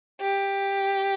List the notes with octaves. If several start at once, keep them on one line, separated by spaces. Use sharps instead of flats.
G4